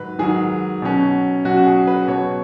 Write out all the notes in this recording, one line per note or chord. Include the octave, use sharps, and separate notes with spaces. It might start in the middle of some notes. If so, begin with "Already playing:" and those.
Already playing: G#2 D#3 F#3 B4
G#2 D#3 F#3 G#4
B2 F#3 C#4
B2 F#3 C#4 F#4
F#4
G#4
B4
B2 F#3 B3 C#5